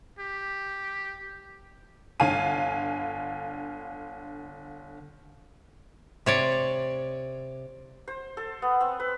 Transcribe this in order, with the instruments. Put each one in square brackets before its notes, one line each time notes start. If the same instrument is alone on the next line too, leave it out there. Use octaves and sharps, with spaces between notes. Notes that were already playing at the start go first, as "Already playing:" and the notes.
[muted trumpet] G4
[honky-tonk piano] G1 D3 F5 G#5 D#7
[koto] C3 C#5 D5
[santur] C5
A4
B3
C4
B4